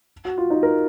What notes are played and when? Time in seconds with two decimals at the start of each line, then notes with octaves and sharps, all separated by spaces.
0.25 F#4
0.38 F4
0.50 D#4
0.63 A#4